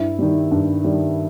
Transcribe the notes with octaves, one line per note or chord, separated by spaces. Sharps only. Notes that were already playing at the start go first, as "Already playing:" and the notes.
Already playing: G2 E4
D#3 G3
G2
D#3 G3